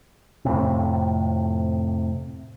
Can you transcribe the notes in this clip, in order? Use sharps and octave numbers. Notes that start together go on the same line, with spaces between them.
F2 A2 C3